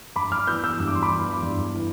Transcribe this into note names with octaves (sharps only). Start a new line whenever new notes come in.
G2 B5 D6
D6 F6
E3 B3 E6 G6
E6 G6
G2 E6
D6
C6
B5 D6
E3 B3
G2
E3